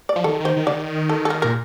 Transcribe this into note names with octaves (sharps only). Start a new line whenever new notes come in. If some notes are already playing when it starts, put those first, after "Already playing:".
D5
F3
D#3 A4
D#3 C5
D#3
D3 D5
D#3
A4
A4
A#4
A#2 A#4